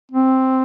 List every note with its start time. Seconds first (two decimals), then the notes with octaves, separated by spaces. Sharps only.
0.12 C4